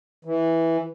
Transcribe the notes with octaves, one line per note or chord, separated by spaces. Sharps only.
E3